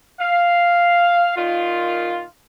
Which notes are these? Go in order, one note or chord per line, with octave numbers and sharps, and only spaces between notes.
F5
A#2 D#3 F4